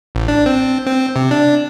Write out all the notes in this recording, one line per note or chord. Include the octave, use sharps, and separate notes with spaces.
A1
D4
C4
C4
C3
D4